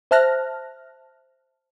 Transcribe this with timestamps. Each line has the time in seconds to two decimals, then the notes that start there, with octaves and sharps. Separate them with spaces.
0.11 C5 E5 A5 F6 F#6 A#6